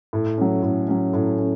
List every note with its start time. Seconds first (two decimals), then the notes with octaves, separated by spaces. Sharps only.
0.13 A2
0.38 F#3 C#4
0.63 A2
0.88 F#3 C#4
1.13 A2
1.39 C#4